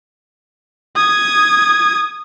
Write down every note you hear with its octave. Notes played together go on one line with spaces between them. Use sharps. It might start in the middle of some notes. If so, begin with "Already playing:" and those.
D#6 G#6